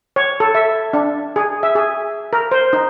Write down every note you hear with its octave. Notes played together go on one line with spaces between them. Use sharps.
C#5
A4
E5
D4
G#4
E5
G#4
A#4
C5
D#4